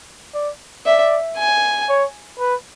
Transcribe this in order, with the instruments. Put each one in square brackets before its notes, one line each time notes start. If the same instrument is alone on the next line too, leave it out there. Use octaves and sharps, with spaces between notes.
[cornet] D5
[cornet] D5 [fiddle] E5
[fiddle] G#5
[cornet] C#5
B4